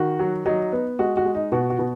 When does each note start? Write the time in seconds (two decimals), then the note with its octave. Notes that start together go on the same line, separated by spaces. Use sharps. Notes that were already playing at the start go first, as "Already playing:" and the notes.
Already playing: D#3 F#4
0.19 F#3
0.46 F#3 D#4
0.73 B3
0.99 G#3 F#4
1.17 F#4
1.25 G#3
1.35 D#4
1.52 B2 F#4
1.70 F#4
1.79 B2